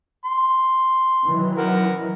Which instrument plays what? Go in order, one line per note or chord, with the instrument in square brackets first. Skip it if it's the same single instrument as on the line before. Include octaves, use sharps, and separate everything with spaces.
[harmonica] C6
[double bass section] D#3 E3 F#3
[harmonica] A#4 F#5